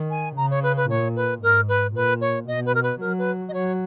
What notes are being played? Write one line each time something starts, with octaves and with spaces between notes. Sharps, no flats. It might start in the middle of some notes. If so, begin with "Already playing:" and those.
Already playing: D#3
G#5
C#3 A#5
C#5
B4
B4
A#2 C#5
B4
G#2 A#4
B4
A#2 B4
C#5
B2 D#5
B4
A#4
B4
F#3 A#4
B4
D#5
F#3 C#5